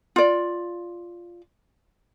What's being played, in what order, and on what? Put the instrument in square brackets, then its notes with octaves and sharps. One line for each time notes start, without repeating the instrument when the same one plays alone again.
[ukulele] F4 D5